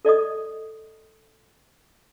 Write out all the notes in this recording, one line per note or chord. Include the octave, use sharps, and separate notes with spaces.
A4 D5 D#5 D#6